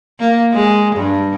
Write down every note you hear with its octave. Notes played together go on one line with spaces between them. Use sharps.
A#3
G#3
G2